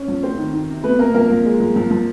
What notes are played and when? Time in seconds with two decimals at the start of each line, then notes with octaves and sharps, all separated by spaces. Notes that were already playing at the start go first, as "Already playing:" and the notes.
Already playing: C#4 C#5
0.08 F3
0.23 A3 C4 C5
0.38 D#3
0.53 D#3
0.69 C3
0.84 A3 B3 B4
0.99 C3 A#3 A#4
1.14 F3 A#3 A#4
1.30 F3
1.46 G#3
1.60 F3
1.76 F3
1.91 F3